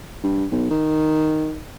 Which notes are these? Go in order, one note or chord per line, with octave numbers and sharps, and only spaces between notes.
G2
B1
D#3